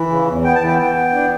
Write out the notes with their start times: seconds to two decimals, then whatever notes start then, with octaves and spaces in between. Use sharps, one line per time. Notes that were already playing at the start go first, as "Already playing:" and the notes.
Already playing: E3
0.10 C#3
0.27 E2
0.44 B3 G5
0.55 A5
0.61 E3
0.67 G5
0.78 B3 G5
0.95 B3
1.13 D4